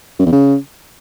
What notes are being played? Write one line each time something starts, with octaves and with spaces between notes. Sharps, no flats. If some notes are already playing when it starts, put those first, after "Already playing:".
F#2
E2
C#3